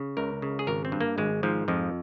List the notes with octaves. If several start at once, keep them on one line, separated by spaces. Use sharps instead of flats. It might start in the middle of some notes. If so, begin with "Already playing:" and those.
Already playing: C#3
C#2 A#4
C#3
G#4
G#1 A#4
C4
G2
A#3
G#1 G#3
G#2 F3
F2 F3